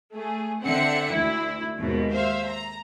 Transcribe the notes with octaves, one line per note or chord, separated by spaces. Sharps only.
A3 G#4
D3 C4 E5 F#5 C#7
D2 E4
D#2 G#2 B2
C5 E5 F5
A#5